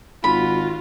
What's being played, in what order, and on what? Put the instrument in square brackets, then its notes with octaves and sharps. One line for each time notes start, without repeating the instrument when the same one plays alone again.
[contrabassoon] G#1 [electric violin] F4 F#4 [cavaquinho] B5